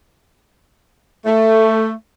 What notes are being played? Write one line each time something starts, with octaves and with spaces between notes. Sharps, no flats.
A3